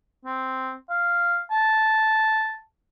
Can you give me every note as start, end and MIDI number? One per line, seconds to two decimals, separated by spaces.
0.25 0.74 60
0.90 1.41 77
1.51 2.57 81